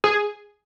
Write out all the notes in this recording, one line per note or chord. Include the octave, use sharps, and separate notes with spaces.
G#4